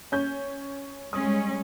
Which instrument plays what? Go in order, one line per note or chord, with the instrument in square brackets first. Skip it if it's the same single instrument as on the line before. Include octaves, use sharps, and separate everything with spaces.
[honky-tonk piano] C#4 G6
[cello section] G3 G#3 C#4 [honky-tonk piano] D#6